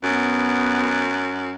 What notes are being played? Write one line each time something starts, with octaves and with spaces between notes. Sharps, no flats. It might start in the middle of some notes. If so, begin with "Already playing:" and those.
F#2 B3